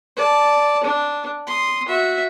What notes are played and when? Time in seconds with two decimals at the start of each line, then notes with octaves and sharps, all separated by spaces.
0.16 D5 A5
0.83 D4
1.47 C6 D#6
1.88 F#4 E5